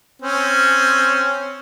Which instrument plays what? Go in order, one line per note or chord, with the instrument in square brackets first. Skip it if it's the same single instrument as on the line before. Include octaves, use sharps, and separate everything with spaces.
[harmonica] C4 C#4